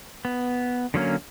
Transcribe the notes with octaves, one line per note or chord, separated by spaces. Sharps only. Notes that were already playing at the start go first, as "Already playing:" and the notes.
B3
D3 F#3 A#3 C#4